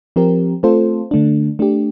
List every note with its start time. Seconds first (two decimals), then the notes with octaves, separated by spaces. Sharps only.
0.16 F3 C4 G4 A#4
0.63 A3 C4 F4 A4 C5
1.11 D3 A3 D4
1.59 A3 D4 G4